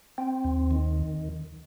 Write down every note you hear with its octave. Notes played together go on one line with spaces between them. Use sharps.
C4
D#2
D#3